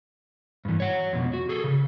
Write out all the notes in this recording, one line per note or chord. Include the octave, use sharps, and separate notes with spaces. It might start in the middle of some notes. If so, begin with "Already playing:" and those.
G2 E3
C#5 F#5
F2 B2
F#4
G#4 A4
C#3